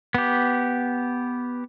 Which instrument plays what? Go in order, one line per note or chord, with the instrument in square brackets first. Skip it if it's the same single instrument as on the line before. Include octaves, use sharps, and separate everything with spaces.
[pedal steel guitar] B3 G4